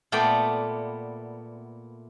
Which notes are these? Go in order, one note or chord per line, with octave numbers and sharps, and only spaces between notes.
A#2 A3 B3 D5 G5